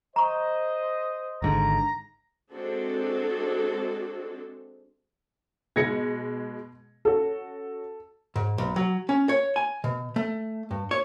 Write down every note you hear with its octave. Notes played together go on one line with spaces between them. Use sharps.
C5 D#5 A#5 C#6
G#1 G#2 D3 A#5
G#3 C4 D4 F#4 A4
B2 G#3 G#6 A#6 C#7
C#4 F#4 A4
G#2
B1
F#3
C#4
C#5
G#5
B2
A3
G2
C#5